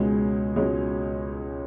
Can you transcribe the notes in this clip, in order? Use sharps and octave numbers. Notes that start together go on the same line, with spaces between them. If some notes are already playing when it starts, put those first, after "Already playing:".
Already playing: C#2 B2 G#3 C#4
C#2 B2 G#3 C#4